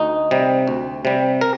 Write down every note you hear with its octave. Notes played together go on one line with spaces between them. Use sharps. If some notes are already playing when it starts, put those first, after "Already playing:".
Already playing: D2 D#4
C3 G3
D2
C3 G3
A#4